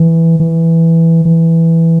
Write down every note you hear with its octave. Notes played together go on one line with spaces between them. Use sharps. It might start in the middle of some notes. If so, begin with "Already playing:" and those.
Already playing: E3
E3
E3